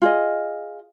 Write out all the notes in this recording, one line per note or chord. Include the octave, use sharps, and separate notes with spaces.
F4 G#4 D#5